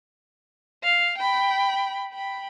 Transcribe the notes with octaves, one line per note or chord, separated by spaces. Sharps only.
F5
G5 B5
G5 B5